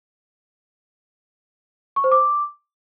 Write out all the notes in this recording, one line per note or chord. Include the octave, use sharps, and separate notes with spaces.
C#6
C5
D6